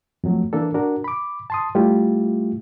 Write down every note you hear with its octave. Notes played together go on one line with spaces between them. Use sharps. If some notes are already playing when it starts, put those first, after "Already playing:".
F2 F#3 A3
E3 A#3 D4 A4
D4 F#4 A#4
B5 D6
A5 C6 D#6
G3 A3 E4 F4 G4